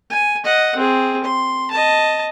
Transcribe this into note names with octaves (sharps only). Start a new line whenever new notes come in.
G#5
D#5 F#5
C4 G#4
C6
D#5 A5